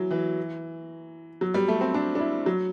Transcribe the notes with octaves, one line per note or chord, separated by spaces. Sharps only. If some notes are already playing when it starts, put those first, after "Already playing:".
Already playing: E3 F#3
E3
F#3
G3
A3
C4
D4
D4
E4
F#3